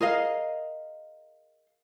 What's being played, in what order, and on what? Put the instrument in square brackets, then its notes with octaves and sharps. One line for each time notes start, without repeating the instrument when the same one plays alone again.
[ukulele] G#4 A#4 D#5 F5